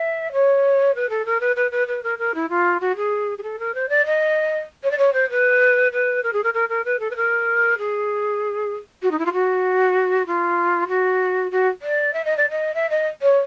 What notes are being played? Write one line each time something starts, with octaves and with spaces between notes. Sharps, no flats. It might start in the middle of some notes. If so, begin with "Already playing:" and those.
Already playing: E5
C#5
B4
A4
A#4
B4
B4
B4
B4
A#4
A#4
E4
F4
F#4
G#4
G#4
A4
A#4
C5
D5
D#5
C#5
D5
C#5
C5
B4
B4
A#4
G#4
A#4
A#4
A#4
B4
A4
B4
A#4
G#4
F#4
D#4
E4
F4
F#4
F4
F#4
F#4
D5
E5
D#5
D5
D#5
E5
D#5
C#5